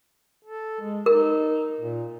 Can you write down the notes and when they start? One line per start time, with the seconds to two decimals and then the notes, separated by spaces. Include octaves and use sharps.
0.45 A4
0.81 G#3
1.06 D#4 A#4
1.81 A#2